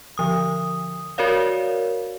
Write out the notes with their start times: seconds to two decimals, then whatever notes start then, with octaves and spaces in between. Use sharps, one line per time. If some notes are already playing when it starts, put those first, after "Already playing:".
0.18 D3 F3 D#6
1.18 F#4 A#4 C#5 D5 F5